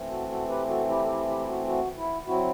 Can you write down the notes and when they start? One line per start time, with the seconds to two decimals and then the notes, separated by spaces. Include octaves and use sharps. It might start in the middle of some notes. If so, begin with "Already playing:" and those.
Already playing: E3 A3 C4
0.08 F#4 A4
0.29 F#4 A4
0.48 G4 B4
0.68 F#4 A4
0.89 E4 G4
1.04 A4
1.07 E4 G4
1.28 E4 G4
1.40 E4
1.47 F#4
1.67 F#4
1.97 E4
2.27 F#3 C4 E4 F#4